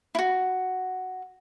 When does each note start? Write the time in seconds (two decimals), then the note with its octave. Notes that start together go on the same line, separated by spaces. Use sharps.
0.15 E4 F#4